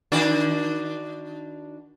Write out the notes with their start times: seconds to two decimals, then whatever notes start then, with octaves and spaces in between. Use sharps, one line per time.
0.12 D#3 D4 F#4